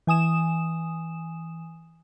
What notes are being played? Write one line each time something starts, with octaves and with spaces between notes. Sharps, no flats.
E3 G#5 D#6 E7